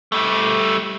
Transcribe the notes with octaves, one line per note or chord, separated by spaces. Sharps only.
G3 A3